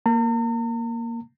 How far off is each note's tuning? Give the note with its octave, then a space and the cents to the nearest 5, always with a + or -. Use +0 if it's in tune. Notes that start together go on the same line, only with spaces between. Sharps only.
A#3 +5 A#5 -45